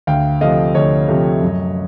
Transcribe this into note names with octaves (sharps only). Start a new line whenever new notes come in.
D2 F5 G5
C3 F3 A3 D#5 F5
D2 C#5 D#5
C3 F3 A3
F#2